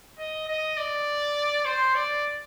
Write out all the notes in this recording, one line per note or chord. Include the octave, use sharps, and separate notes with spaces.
D#5
D#5
D5
C5
D5